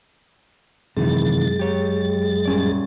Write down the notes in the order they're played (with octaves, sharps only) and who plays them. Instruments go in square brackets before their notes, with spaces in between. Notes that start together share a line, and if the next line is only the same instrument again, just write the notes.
[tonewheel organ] F#2 G#3 A6 [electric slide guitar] C3 D#3 E3
[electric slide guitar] G4 C#5
G3 C#4 D5